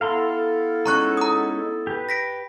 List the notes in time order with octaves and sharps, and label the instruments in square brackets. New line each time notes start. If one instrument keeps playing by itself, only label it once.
[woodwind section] B3 E4 A4 [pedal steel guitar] F5 A#5 C6
[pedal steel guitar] G#3 C#4 D#4 [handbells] A#5 C#6 F#6
[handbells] A#5 D#6
[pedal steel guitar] G4 B4
[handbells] A#6 B6 D7